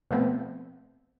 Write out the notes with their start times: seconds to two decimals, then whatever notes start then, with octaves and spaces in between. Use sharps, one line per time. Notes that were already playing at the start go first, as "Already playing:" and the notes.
0.11 B2 F3 A3 B3 C4